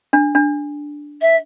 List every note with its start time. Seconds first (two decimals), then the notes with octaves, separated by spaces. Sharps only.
0.13 D4
0.35 D4
1.21 E5